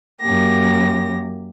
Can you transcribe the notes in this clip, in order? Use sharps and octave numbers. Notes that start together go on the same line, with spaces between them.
F#2 A#3 G4 A#6